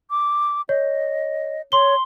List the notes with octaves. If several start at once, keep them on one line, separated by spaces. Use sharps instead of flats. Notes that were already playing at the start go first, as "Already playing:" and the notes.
D6
C#5 D#5
C#5 C6 G7